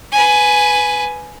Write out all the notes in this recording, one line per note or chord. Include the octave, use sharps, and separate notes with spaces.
B4 G#5